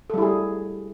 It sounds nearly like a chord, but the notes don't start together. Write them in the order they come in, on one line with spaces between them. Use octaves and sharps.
A4 G3 E4 G#4